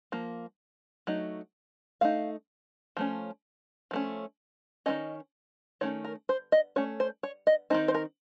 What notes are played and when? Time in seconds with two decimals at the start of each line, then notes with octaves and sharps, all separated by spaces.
0.12 F3 A#3
1.07 F#3 A3 D#4
2.01 A3 D#4 F5
2.97 F3 A3 C#4
3.91 F3 A3 C#4
4.86 D#3 A#3 C#4 D#5
5.81 D#3 A3 C#4 C#5
6.05 A#4
6.29 C5
6.52 D#5
6.76 A3 C#4 C#5
7.00 C5
7.23 C#5
7.47 D#5
7.70 D#3 A3 C4 D#4 C5
7.88 C5
7.94 A#4